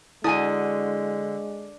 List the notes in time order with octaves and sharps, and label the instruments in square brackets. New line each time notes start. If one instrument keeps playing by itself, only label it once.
[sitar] D3 [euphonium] G#3 [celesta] E4 [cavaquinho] F#4 G#5 D#6